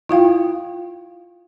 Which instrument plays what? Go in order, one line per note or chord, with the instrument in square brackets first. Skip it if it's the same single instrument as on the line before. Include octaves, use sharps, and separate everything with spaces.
[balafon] E4 F4 F5 G5